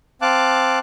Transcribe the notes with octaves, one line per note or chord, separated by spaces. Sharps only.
C4 F5 A5 D6 F#6